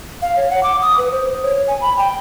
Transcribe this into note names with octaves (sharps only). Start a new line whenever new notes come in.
F5
C#5
F#5
D6
D#6
B4
C5
C#5
G#5
B5
G5